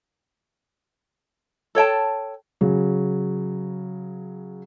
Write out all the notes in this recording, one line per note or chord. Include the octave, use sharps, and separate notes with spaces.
A4 C#5 G5 A5
C#3 F#3